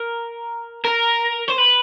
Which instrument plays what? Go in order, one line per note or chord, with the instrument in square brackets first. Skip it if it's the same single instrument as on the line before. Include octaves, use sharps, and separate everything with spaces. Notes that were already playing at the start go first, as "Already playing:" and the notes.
Already playing: [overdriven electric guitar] A#4
A#4
C5
B4